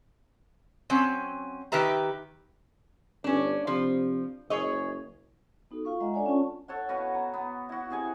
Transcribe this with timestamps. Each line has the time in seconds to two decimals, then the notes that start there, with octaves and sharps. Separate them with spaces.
0.90 F#3 C4 C#4
1.72 D#3 G4 B4 E5 A#5
3.24 G1 C#4 D4
3.67 C3 F3
4.50 F#1 G#4 C#5 D#5
5.71 B3 D#4 F#4 A4
5.85 F4 F5 C#6
6.00 G#3 D#5 E5 F#5 A#5
6.14 D4 A4 C#5 D5 F#5 G#5
6.26 C#4 F4 A5 C#6
6.68 A4 C#5 F#5
6.89 B2 F#4 B4 F5
7.15 A#5
7.34 B3
7.69 E4 F#4
7.90 C3 G#4 G#5